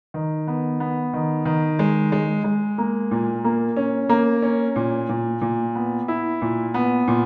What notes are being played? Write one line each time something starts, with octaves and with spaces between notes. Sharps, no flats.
D#3
B3
B3
D#3
D#3
G#3
G#3
G#3
A#3
A#2
A#3
C#4
A#3
C#4
A#2
A#2
A#2
B3
E4
A#2
B3
A#2